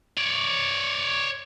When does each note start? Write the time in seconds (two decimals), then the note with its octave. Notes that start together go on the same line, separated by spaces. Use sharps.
0.17 C#5 D5